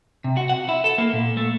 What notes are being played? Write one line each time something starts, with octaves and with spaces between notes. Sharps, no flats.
C3
F#4
F#5
E4
A4
A#3
A#2
A3